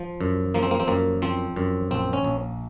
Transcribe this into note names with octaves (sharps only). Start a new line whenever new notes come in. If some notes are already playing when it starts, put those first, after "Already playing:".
Already playing: F3
F#2
F3 A#3
C4
A#3
C4
F#2 A#3
F3 C4
F#2
A#1 C4
C#4
A#1